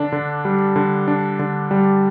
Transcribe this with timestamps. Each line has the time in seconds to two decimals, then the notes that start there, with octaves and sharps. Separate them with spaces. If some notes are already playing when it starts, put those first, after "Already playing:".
Already playing: D3 D4
0.12 D3
0.45 G3
0.76 D3
1.08 D4
1.39 D3
1.71 G3